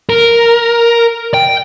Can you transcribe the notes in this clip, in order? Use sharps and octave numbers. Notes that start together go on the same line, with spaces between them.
A#4
G5